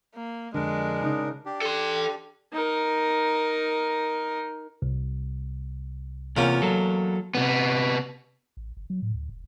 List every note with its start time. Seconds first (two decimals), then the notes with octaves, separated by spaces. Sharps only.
0.15 A#3
0.54 F2 D3 G#3 D4 A#4
1.01 C#3 D#4
1.46 D4 G4
1.62 A4 C6
2.52 D#4 A#4
4.82 C2
6.37 E2 C3 A#3 C#4 F4
6.62 F#3 A4
7.35 C3 B3
8.57 A1
8.77 G1
8.90 F#3
9.02 A2
9.14 D2
9.29 E1